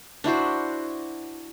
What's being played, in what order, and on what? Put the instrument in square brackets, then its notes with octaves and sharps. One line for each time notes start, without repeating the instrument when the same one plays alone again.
[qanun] D4 E4 F#4 C5